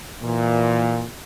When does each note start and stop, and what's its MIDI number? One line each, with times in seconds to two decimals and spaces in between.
0.22 1.06 46
0.22 1.06 52